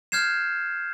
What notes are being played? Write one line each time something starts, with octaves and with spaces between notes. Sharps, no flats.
F6 G6 G#6 C7 E7